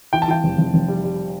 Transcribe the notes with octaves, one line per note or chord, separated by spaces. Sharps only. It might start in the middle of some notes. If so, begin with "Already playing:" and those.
E3 G5
A5
E3 G5
F1
F1
F1
G3
G3